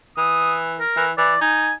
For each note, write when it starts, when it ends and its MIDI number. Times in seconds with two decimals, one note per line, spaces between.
0.17 0.80 52
0.17 0.55 87
0.80 1.04 70
0.97 1.11 52
1.18 1.35 52
1.18 1.40 74
1.41 1.73 63
1.41 1.73 80